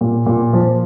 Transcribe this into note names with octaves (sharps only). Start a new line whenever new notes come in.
A#2
A#2
F3